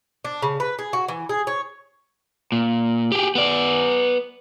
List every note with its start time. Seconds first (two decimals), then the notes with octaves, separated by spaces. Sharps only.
0.25 D4
0.42 C#3
0.60 B4
0.79 G#4
0.93 F#4
1.08 E3
1.29 G#4
1.47 C#5
2.52 A#2
3.12 G4 G#4
3.35 B3 D5